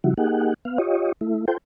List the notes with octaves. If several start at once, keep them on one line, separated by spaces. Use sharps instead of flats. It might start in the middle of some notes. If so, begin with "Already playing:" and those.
C#3 F3 G3 E4 F#4
A#3 D#4 G4 G#4 F#5
B3 F5
F4 G4 C#5 D#5
A3 E4
F4 A4 C5 G5